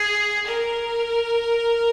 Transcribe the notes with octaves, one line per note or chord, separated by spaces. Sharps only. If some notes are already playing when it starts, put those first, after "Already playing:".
Already playing: G#4
A#4